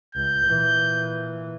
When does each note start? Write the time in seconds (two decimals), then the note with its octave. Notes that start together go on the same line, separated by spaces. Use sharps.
0.15 C#2 G6
0.45 A#2 E3